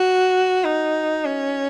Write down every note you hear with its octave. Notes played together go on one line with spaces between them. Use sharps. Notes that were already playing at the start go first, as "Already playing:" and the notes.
Already playing: F#4
D#4
C#4